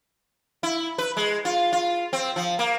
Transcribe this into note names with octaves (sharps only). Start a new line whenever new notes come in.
E4
B4
G#3
F4
F4
C4
F3
A#3